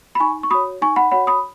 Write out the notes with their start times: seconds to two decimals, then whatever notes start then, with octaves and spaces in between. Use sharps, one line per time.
0.15 B5
0.20 D#4 G#5 C#6
0.43 C#6
0.51 F#4 C#5 B5 D#6
0.82 D#4 G#5 C#6
0.96 F#5 B5
1.11 F#4 C#5 F#5 B5
1.27 B5 D#6